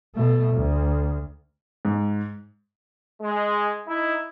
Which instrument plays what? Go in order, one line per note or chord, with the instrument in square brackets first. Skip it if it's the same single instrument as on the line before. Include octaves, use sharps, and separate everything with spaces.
[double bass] B2 A3
D2
[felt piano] G#2
[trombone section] G#3
D#4 E4